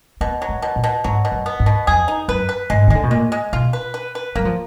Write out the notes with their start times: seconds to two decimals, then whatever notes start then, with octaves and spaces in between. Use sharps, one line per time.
0.21 B2 B3
0.42 F#3
0.49 G#3
0.62 B2
0.76 A#2
0.84 B2
1.04 G#2 F#3
1.25 B2
1.32 F#2
1.46 B3
1.60 G#2
1.66 B2
1.87 F2 G#4
2.08 D#4
2.28 F#2 B4
2.49 B4
2.70 G#2 G#3
2.88 D#3
2.90 D3 G#3
3.03 B2
3.11 A#2 G#3
3.32 G#3
3.53 B2 F4
3.73 B4
3.94 B4
4.15 B4
4.35 F#3 A#3
4.45 F3